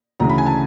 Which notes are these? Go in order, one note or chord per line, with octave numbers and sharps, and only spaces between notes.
D2 C#3 E3 A#5
B5
G#5
A5